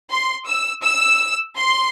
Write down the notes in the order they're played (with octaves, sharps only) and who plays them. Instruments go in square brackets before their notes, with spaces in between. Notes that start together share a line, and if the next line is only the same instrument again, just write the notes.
[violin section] C6
E6
E6
C6